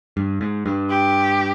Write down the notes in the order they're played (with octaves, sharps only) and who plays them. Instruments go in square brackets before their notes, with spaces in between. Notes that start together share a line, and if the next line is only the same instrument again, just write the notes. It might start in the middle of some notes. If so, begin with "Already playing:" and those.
[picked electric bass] G2
G#2
G2
[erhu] G4